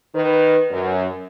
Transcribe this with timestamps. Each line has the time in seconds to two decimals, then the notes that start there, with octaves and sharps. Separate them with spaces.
0.14 D#3 B4
0.71 F#2